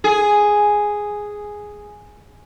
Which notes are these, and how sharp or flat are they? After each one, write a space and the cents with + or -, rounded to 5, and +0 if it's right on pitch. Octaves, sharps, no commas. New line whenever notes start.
G#4 +0